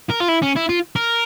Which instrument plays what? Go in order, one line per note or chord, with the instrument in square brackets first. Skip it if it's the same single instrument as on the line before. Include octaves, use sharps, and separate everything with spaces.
[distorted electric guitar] A#4
F4
E4
C#4
E4
F4
A#4